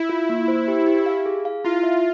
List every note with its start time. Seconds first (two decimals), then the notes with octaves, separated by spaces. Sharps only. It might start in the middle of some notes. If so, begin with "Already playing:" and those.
Already playing: E4
0.09 F4
0.29 A#3
0.48 C5
0.68 G4
0.87 G4
1.06 F5
1.26 G#4
1.45 F5
1.64 E4 F4
1.83 E5